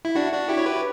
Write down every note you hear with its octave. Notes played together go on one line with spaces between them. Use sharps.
E4
D4 F#4
D4 F#4
E4 G4
C#5
G4 B4